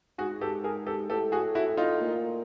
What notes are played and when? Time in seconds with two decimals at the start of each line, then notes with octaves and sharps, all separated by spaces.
0.18 G#2 F#4 G#4
0.41 G4 A4
0.64 G#4 A#4
0.86 G4 A4
1.10 A2 G4 A4
1.32 F#4 G#4
1.55 E4 F#4
1.77 D#4 F4
2.01 A#2